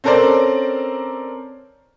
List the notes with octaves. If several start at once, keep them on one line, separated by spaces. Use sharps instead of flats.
C4 C#4 A4 A#4 C5 D5